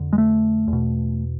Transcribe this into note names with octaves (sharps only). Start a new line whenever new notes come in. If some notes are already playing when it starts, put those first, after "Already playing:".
Already playing: F2 D3
G#3
A3
E2
B2